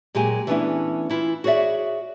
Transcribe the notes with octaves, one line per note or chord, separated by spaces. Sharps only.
A#2 F#3 G#3 G4 G#5
E3 A3 B3 C#4 D4 E4
E3 E4 F4
F#4 G#4 C#5 D5 E5